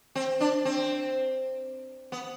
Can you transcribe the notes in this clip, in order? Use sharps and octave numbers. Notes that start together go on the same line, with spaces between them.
C4
D4
C4
B3